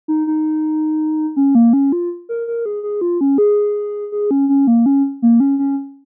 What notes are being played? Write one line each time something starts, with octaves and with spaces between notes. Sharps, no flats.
D#4
D#4
C#4
A#3
C#4
F4
A#4
A#4
G#4
G#4
F4
C#4
G#4
G#4
C#4
C#4
A#3
C#4
A#3
C#4
C#4